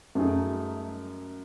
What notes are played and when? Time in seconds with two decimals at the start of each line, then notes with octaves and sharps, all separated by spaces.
0.15 F#2 A3 D#4 G#4